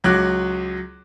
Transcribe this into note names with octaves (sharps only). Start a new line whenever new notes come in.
C#2 F#3 F#4 D6 F#6